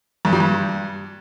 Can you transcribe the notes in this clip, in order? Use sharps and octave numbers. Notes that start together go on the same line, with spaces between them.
G2
G3
G2